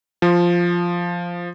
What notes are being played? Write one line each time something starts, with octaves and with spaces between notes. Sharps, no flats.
F3